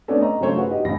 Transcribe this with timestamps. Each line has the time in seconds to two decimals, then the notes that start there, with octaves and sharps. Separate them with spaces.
0.08 A3 B3 C#4 D4 C#5 D5
0.20 D#5 A#5
0.40 G2 C#3 F#3 A3 C5 C#5
0.55 F4 F#4 G#4 B4 F#5
0.70 D#4 G4 D#5
0.85 F1 C#2 G#2 D#5 B5 A#6